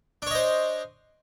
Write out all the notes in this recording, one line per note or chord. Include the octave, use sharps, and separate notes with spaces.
D4 C5 C#5 D#5